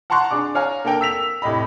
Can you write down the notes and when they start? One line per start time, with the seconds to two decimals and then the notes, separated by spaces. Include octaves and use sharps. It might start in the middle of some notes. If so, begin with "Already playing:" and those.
0.10 F#5 A5 A#5 C6 C#6 F#6
0.31 D4 G#4 D5 D6
0.55 C#5 F5 G#5 A#5
0.85 A#3 D4 A4 A#4 G5
1.01 E6 B6 F7
1.42 F1 A2 G4 D#5 B5